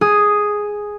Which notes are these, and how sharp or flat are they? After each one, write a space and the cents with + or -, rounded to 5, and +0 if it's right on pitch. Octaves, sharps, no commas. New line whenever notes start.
G#4 +0 D#6 +0